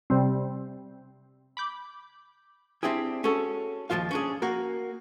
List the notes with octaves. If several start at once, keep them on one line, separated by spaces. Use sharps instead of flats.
C3 G3 C4
B5 D6 G6
C4 D4 E4 G4 G#4
C#4 F#4 G#4 A4
D#2 G#2 F3 F4 F5
C#4 D4 G#4
A#3 F#4 A#4